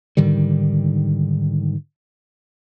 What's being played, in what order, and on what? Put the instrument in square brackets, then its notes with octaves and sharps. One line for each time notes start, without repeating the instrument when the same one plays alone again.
[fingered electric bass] G#2 D3 D#3 G3